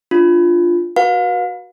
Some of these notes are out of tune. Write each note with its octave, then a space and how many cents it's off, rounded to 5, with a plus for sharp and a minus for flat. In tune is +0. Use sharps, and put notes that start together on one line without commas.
D4 +0 F4 -5
F#4 +0 B4 -35 F5 +35